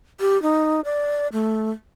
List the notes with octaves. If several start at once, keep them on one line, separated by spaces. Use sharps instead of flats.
G4
D#4
D5
A3